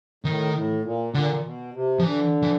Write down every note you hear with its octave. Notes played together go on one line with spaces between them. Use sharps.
A2 D#3
A2
A#2
A#2 D3
B2
C3
F3
D3 E3
E3